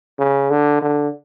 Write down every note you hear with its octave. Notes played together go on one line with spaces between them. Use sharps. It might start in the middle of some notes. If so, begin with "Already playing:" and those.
C#3
D3
D3